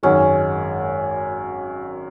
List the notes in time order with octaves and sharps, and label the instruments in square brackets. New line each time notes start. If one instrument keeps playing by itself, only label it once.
[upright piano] G#1 F#2 D#3 G#3 [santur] C#4